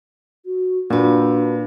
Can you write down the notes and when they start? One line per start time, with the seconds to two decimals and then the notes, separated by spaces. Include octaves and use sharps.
0.46 F#4
0.90 A#2 D4 F#4 B4